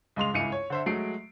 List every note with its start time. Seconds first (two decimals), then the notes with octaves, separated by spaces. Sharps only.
0.16 C#2 G#3 C6 F7
0.34 G#1 C#2 E4 G#5 C#7 D#7
0.52 C#5
0.70 D3 C5 E5
0.86 F#3 G#3 A3 C7 D7